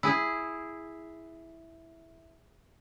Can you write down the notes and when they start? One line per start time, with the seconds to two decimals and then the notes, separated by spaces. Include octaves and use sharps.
0.03 E4 G#4